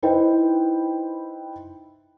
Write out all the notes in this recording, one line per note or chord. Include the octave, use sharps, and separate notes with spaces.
D#4 E4 B4 C5 D#5 G5